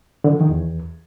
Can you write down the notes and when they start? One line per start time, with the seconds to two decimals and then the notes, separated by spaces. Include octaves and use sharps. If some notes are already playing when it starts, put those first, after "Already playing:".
0.24 D3
0.33 F3
0.41 D#3
0.49 E2